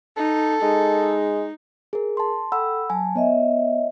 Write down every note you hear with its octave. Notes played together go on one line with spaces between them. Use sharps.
D#4 A4
G#3 D#4
G#4 A#4
A5 C6
A4 F#5 G5 B5 E6
F#3 G#5 A5
B3 C#5 D#5 E5